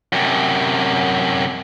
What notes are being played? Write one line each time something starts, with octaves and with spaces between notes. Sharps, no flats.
F#2 C3